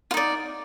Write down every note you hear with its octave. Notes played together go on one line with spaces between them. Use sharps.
D#4 F4 D5